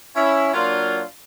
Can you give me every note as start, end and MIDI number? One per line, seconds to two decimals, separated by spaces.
0.16 0.50 61
0.16 0.50 64
0.54 1.02 54
0.54 1.02 58
0.54 1.02 62
0.54 1.02 65